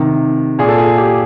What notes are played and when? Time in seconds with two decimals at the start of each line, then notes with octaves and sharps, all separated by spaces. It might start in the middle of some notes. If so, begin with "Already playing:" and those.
Already playing: C3 D#3
0.59 A#2 G#4
0.69 A4
0.78 G#4
0.98 G4